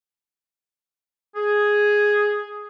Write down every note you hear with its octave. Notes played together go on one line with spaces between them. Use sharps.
G#4